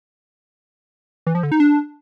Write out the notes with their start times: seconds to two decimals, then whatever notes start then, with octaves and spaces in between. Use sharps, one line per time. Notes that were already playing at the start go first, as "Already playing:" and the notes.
1.27 E3
1.35 F3
1.43 D3
1.52 D#4
1.60 D4